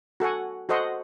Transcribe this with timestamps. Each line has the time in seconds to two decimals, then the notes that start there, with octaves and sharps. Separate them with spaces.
0.20 F#4 A4 F#5 G#5
0.69 F#4 A4 C5 D#5 F#5 C6